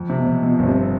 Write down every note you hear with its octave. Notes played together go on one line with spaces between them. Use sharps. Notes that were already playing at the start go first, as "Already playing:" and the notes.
Already playing: F2
C3
B2
F2
B2 F3
G1
C3